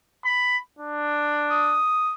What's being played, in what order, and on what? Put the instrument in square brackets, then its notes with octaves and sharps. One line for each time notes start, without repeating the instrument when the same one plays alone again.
[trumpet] B5
D4
[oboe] D#6